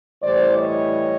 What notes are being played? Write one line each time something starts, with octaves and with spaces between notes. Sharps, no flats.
A2 E3 G3 C5 D5
C#5 D#5